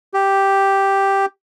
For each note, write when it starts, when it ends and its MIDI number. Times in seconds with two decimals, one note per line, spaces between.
0.14 1.26 67